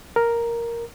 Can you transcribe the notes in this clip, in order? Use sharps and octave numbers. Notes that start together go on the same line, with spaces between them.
A#4